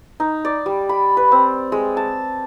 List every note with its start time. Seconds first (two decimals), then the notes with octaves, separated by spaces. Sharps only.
0.20 D#4
0.45 D5
0.66 G3
0.89 B5
1.17 B4
1.32 C4
1.72 G#3
1.97 A5